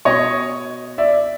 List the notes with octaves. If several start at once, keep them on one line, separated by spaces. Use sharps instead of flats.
B2 C#5 D#5
D5 E5